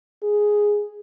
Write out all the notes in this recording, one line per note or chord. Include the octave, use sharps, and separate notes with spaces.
G#4